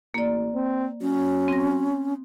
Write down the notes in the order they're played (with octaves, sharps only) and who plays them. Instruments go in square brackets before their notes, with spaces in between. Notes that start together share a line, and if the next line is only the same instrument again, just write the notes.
[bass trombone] A1 [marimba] A#3 D5
[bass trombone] C4
[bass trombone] F#3 [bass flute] C#4
[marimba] C4 A#6